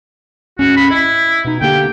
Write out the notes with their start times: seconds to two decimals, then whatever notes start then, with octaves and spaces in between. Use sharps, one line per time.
0.59 D2 G#2 C#4 F#4
0.77 B5
0.90 E4 D#5
1.45 B2 D#4
1.61 D3 A#3 G4 G5